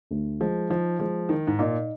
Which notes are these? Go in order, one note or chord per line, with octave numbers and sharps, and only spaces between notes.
D2
F3 G#3
F3 D#4
F3 G#3
D#3 D#4
G#2
A#2 D#4